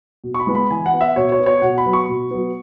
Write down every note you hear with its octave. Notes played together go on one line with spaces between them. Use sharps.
B2
C#6
B5
G#3 B3
B5
E3 G#5
F#5
B3
E5
B2 C#5
C#5
B3
C#5
B2 F#5
B5
F#3 B3
C#6
B2
F#3 B3